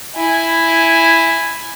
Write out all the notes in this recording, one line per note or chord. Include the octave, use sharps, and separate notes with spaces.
E4 G#5